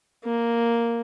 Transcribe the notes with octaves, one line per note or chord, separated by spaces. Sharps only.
A#3